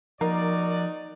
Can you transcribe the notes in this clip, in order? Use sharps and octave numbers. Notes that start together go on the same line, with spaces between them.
F3 A#3 D#4 F#4 A#4 D5